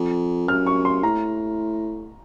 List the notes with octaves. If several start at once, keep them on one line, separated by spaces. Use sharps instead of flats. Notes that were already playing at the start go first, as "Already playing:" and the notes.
Already playing: F2
F#2 F6
C#6
C6
A2 A#5